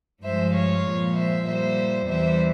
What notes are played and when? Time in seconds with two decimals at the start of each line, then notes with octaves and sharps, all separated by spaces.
0.23 G2 F3 G#3 C5 E5
0.53 C#5 F5
0.84 A#2 F3 G#3
1.14 C5 E5
1.45 A#2 G3 C5 E5
2.06 E2 E3 G3 C5 E5